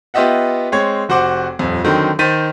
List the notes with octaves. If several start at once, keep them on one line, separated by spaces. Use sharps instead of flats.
B3 F4 G4 D#5 E5 F#5
G#3 C4 C#5 G#6
F1 F#4 C5 F#5 D6
D#1 F2
D3 D#3 F#3 C4
D#3 C5 A6 B6 D#7